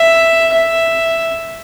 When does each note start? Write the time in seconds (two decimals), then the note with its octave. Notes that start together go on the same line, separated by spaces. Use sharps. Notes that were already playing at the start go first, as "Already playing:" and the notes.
Already playing: E5
0.52 E5